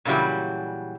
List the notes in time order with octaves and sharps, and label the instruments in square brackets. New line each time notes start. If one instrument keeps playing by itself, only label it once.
[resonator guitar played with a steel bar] A#2 C#3 E3 F#3 G3